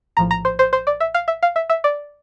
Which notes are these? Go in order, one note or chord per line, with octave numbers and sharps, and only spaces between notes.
A#1 A2 F3 A#5
A#5
C5
C5
C5
D5
E5
F5
E5
F5
E5
E5
D5